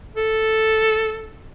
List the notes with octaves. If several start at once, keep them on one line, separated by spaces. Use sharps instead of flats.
A4